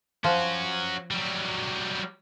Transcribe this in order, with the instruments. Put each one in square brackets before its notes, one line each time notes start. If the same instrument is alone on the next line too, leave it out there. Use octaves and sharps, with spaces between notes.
[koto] F3 [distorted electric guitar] C#4 F#4
[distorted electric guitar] F#3 G3